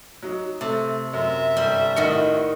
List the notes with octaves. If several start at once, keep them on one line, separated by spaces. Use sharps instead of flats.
F#3 D#4
C3 A3
F#2 E5
G1 G3
A1 D#3 F#4 B4 D#5 C#7